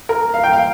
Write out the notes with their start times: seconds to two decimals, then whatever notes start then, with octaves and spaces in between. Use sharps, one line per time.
0.09 A#4
0.34 F5
0.44 G5
0.53 F5